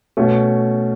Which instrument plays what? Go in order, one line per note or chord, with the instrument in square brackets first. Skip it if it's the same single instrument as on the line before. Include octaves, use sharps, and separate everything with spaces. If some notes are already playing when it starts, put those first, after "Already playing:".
[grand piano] B2 A3 C#4